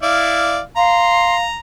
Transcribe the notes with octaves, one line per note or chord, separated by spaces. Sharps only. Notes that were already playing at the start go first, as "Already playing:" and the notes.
E4 D5 F5
F5 A#5 C6